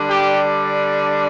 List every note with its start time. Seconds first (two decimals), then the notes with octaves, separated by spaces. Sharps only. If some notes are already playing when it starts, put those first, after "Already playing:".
Already playing: D3 G3 D4
0.10 G4